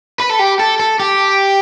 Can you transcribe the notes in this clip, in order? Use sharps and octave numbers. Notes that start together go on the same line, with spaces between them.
B4
A4
G4
A4
A4
G4